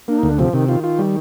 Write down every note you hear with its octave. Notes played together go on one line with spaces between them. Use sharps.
A#3 D4
D2 D#4
D4
C3 F3
C3 D#3
D#3 F4
F4
G3